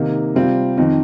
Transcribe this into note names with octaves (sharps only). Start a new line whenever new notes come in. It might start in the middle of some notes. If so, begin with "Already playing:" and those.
Already playing: C3 D#3 A#3 D#4
C3 G3 C4 F4
F2 D#3 C4 D#4